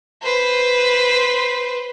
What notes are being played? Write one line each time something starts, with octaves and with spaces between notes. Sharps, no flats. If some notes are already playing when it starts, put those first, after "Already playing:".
B4 C5